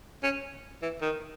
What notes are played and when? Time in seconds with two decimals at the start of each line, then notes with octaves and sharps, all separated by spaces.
0.23 C#4
0.82 E3
1.02 D#3